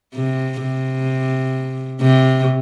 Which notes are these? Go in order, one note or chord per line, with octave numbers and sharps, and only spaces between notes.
C3
C3
C3